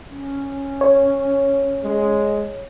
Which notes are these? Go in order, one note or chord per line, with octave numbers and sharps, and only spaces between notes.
C#4
C#5
G#3